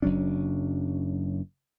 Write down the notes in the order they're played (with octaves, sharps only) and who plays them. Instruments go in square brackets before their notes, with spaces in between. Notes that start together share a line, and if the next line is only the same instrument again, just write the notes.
[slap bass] F#1 F#3 C#4 D4